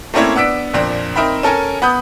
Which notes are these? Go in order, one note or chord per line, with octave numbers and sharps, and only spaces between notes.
A3 A#3 C4 C#4 E4 C#5
B3 D4 E6 B6 D7
F2 A#2 C4 D4
C4 D#4 A#4 E5 G5 B5
C#4 A4 A#4 G#5
B3 B5 D#6 G6